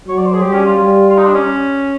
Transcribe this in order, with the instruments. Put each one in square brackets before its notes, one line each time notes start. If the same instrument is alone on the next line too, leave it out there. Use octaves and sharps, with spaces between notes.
[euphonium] F#3 [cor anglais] C#5
[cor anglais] D5
C5
G#4
[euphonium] G3 [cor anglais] G4
[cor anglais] C#4
F4
[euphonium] G3
[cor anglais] F4
D#4
D4
C#4